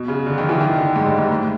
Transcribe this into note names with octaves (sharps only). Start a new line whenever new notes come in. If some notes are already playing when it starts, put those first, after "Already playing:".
Already playing: B2
C#3
D3
D#3
E3
D#3
D3
G#2
G2
G#2
A2